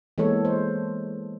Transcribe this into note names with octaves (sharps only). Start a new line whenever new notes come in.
E3 G#3 A#3 B3 A4 C#5
C5